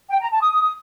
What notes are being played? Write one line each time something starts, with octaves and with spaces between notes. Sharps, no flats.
G5
A#5
A5
D#6